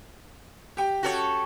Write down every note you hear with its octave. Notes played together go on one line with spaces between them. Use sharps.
G4 G5
F#4 A4 C#5